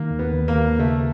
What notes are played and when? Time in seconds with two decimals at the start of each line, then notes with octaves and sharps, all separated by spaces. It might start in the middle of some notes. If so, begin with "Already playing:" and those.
Already playing: D#3 A#3
0.11 D#2
0.19 B3
0.33 D#2
0.48 A#3
0.56 D#2
0.78 C#3 A3